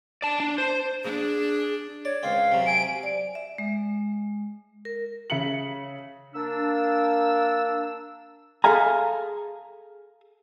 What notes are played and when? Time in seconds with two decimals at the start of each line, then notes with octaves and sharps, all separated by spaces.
0.22 D5 A5
0.40 D4
0.58 C5
1.04 D4 G#4
2.05 C#5 D5
2.23 C#2 C4 F5
2.52 C3 F#3
2.66 G#5 D7
3.03 D5
3.35 E5
3.58 G#3
4.85 A#4
5.30 C#3 E5 B6 C#7 F#7
6.34 A#3 D4 E6
8.64 G#4 A4 E5 F5 G#5 A#5